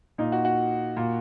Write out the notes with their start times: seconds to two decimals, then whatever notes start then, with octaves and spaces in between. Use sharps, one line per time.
0.18 A#2 D#4
0.32 F#4
0.45 F#4
0.97 A#2